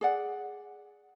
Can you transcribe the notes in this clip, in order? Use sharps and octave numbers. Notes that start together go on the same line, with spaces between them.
G#4 D5 F#5